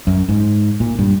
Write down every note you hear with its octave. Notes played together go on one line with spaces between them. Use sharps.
F#2
G#2
A#2
G2